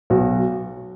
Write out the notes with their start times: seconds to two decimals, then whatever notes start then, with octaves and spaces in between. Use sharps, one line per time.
0.10 B1 F#4